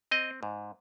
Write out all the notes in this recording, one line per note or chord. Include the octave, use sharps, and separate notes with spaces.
C4 D#5
G#2